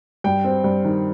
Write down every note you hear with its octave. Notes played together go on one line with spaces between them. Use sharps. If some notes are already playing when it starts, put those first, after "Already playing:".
G2 G5
C4
G2
D#3